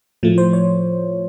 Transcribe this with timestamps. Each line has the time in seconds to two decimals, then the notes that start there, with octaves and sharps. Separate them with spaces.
0.23 A2 F3 A3
0.38 C5
0.53 C#5